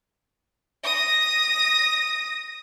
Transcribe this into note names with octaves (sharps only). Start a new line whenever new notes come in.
D#6 A#6